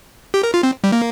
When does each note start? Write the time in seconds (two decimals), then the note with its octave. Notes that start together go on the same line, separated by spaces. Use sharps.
0.34 G4
0.43 A#4
0.54 F4
0.63 C4
0.84 G3
0.92 A#3